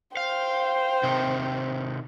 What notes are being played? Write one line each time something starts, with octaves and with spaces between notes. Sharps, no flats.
C5 F5 G5
C3 D#3